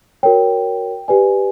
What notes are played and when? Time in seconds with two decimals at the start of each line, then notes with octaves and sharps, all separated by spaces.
0.23 F#4 A#4 C#5 G5
1.08 G4 B4 D5 G#5